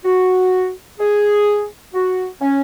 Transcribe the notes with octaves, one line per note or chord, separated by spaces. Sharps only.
F#4
G#4
F#4
C#4